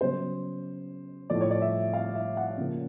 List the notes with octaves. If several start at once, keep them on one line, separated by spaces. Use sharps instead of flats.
C#3 F#3 B3 C5
A2 F3 A3 D5
C#5
D5
E5
F5
E5
F#5
C#3 F3 A#3 C#4